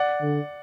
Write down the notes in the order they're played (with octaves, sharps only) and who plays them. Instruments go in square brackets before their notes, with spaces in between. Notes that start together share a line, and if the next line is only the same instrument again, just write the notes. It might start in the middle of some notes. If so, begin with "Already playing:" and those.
Already playing: [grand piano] D5 F#5
[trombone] D3